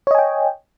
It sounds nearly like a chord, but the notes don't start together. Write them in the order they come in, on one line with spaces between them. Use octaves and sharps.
C#5 D#5 G#5 G5